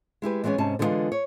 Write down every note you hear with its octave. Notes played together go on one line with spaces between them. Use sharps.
G#3 E4 G4 B4
E3 G#3 A3 B3 C#4
G#2 C3 C#4 A5
D3 E3 G3 G#3 B3 F4
C#5